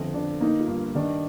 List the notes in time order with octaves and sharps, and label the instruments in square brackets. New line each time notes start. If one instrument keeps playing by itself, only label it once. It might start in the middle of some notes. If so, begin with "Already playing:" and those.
Already playing: [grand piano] G1 F2
[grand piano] G1 [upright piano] D4
[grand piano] A#3 [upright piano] D#4
[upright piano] F4
[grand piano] G2
[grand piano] D#3 [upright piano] D4